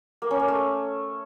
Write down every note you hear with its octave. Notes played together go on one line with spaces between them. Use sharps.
A#3
C#4
A#3
A3